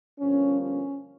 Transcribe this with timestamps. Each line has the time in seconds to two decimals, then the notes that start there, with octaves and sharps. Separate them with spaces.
0.20 G1 G2 F3 A#3 C#4
0.61 C#4